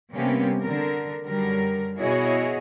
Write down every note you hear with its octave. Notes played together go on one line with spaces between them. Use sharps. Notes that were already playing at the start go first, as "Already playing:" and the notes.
C3 G3 A#3 B3 C#4 G4
D3 A#4
F#2 D3 F#3 G3 A#4
B2 E4 F#4 G#4 C#5 D#5